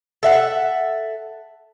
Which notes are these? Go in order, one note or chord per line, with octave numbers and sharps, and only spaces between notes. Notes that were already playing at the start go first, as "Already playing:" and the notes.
A4 E5 F#5